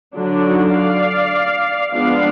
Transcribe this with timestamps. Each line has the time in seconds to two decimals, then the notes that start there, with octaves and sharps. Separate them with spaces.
0.15 D3 F#3 D4
0.44 D#4 F#4
0.75 D5 F5
1.92 F3 G#3 B3 D4 D5 F5